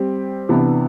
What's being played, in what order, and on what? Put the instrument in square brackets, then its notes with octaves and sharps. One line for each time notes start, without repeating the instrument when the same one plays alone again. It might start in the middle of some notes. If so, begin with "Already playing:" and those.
Already playing: [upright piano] G3 C4 G4
C3 E3 B3 D4